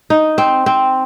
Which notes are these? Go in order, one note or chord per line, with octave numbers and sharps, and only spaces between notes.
D#4
C4
C4